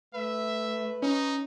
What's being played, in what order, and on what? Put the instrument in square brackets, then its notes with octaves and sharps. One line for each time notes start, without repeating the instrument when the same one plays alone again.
[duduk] A3 [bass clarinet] B4 [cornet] E5
[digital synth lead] C#4 [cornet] D#4